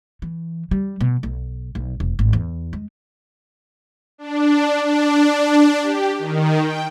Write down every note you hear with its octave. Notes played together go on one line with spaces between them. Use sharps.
E3
G3
B2
B1
B1
E1
G#1
E2
G#3
D4
D4
G4
D#3
G5